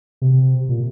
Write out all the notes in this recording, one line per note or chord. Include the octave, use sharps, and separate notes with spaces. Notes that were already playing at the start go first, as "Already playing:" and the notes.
C3
A#2